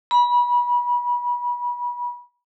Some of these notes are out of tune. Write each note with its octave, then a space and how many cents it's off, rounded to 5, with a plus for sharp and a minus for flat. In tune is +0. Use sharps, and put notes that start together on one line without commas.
B5 -30